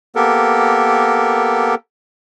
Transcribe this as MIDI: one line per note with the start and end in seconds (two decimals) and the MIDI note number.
0.16 1.75 58
0.16 1.75 59
0.16 1.75 67
0.16 1.75 69
0.16 1.75 70